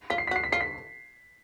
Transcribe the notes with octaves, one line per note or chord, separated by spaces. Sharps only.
F4 B6
C7
B6
F#4
C7
B6
F4 C7
B6